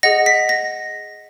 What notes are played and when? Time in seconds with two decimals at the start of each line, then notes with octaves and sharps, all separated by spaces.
0.03 G#4 D#5 F#5 A#6
0.26 B6
0.49 A#6